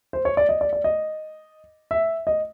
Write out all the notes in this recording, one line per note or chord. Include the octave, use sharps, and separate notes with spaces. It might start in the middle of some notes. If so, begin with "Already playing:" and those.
C5
C#5
D5
D#5
D5
D5
D#5
E5
D#5